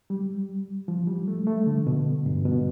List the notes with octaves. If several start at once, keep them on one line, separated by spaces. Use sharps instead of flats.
G3
F3
G3
A3
A3
D3
B2
G2
B2